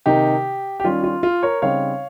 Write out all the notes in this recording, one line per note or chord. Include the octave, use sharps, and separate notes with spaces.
C3 D#3 A#3 D#4 G4
G4
D#3 G3 C#4 F4
F4
F4
A#4 C#5
C#3 G3 C4 D#4 C#5 F5